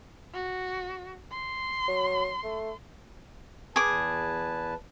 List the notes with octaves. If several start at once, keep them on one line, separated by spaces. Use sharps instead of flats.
F#4
C6
F#3
A3
E2 G#4 B4 A5 D6